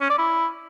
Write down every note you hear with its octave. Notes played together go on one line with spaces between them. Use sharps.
C#4
D5
E4